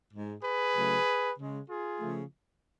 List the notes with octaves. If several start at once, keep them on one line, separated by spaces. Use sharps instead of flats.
G#2 G#3
G#4 B4
C#3 F#3 A3
C#3 G#3
F4 G#4
C#3 F3 A3